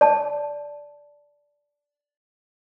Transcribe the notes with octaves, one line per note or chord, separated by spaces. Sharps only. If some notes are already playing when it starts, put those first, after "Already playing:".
D5 A5